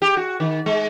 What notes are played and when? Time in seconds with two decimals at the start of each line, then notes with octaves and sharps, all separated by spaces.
0.02 G4
0.17 F#4
0.40 D#3
0.66 G#3